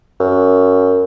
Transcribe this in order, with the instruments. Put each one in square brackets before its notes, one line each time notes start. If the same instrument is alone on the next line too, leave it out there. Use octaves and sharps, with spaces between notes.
[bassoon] F#2